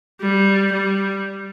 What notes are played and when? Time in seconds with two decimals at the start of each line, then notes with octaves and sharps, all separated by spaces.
0.21 G3
0.72 G3